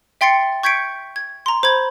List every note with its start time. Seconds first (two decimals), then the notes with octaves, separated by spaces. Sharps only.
0.21 E5 G5 C6 A6 C7 C#7
0.63 C#6 G6 G#6 B6 C#7 D7
1.16 G#6
1.46 A#5 C6
1.63 C5 B5 G#6